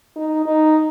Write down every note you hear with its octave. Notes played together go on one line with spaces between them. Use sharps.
D#4
D#4